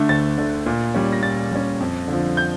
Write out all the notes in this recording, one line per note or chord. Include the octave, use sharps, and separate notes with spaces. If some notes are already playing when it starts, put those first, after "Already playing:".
Already playing: D3 A3 D4
D2 A6
D3 A3 D4
A#2
G3 C#4
A#6
A#2 A6
G3 C#4
F2
D3 F3
G6